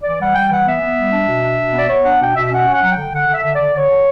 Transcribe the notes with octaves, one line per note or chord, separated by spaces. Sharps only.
E3 D5
G3 F#5
G3 G5
E3 F#5
B3 E5
B3
G3
D4
B2
D4
B2
B3 D5
B3 C#5
D4 F#5
B2 G5
B2 E5
C#4 F#5
C#4 F#5
F#3
D3 G5
D3 F#5
D3
E5
D3
D5
D3
D3 C#5
D3